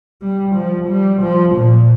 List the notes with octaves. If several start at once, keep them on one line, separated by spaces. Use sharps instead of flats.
G3
F3
G3
F3
A#2